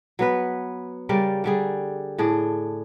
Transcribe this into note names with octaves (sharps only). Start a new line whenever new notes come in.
F#3 B3 B4
C#3 G3 A#4 D5
D3 G3 G#4
A2 D4 G#4